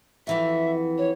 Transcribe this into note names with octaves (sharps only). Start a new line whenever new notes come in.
F2 E3 F#4 E5
C#5